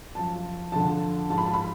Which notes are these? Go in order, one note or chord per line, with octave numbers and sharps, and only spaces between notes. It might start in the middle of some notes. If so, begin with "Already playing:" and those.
F#2 F3 A5
F2 D3 F3 A5
G#2 F3 A5
B5
A5
B5